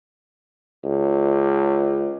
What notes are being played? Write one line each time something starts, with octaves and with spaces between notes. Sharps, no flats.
C#2